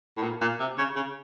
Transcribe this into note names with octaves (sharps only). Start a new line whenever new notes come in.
A2
A#2
A#2
C3
C#3
C#3